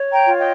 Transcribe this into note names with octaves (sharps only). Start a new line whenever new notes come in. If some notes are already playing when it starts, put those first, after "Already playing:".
Already playing: C#5
G5 A#5
F4
D#5 G5